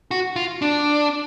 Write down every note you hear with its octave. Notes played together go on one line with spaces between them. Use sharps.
F#4
F4
D4